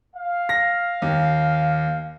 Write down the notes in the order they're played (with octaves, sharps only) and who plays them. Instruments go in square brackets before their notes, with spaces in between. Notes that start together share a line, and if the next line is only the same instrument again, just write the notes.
[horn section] F5
[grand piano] A#6
D#2